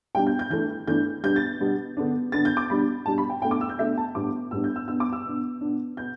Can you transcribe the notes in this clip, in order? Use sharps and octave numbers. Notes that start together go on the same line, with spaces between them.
B2 G3 D4 G5
G6
G6
E3 A3 D4 G6
E3 A3 D4 G6
B2 G3 B3 D4 G6
A6
B2 G3 B3 D4
D3 B3 D4
D3 B3 D4 A6
G6
D6
B2 G3 D4 B5
B2 G3 D4 A5
B5
G5
B2 A3 D4 G5
D6
E6
G6
B2 A3 D4 E5
A5
A2 G3 B3 D4 D6
A2 G3 B3 D4 E6
G6
E6
B2 B3 D4 E6
D6
E6
B2 B3 D4
B2 B3 D4
B2 B3 G6